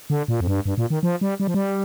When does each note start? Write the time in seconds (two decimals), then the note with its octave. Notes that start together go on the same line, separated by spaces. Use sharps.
0.10 D3
0.28 A#2
0.40 F2
0.47 G2
0.66 G2
0.78 A#2
0.90 D#3
1.03 F3
1.21 G3
1.40 G3
1.47 F3
1.54 G3